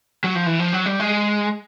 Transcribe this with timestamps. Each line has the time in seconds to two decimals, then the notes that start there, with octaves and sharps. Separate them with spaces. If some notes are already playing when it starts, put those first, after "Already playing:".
0.24 F#3
0.35 F3
0.46 E3
0.59 F3
0.73 F#3
0.86 G3
1.00 G#3